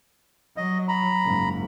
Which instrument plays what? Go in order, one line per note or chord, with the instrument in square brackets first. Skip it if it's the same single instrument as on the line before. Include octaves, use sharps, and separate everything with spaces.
[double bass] F#3 [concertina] D#5
[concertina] A#5 B5
[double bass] F#1 G#2